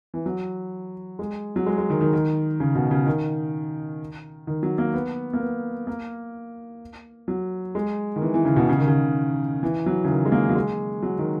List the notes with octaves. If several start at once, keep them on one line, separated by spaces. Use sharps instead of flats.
E3
F#3
G#3
F#3
G#3
G#3
D#3
D#3
D#3
C#3
B2
C#3
D#3
D#3
F#3
A#3
B3
A#3
B3
A#3
F#3
G#3
D#3
E3
E3
C#3
B2
C#3
D#3
C#3
E3
F#3
C#3
D#3
G#3
A#3
F#3
G#3
F#3
D#3